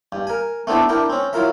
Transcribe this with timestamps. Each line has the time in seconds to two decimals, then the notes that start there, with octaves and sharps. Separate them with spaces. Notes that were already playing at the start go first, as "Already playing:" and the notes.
0.12 G2
0.27 A#4 G#5
0.67 A3 B3 C4 D4 E4 A4
0.89 D4 E4 A#4 G5
1.09 C4 C#4
1.33 F#3 E4 F4 A#4 E5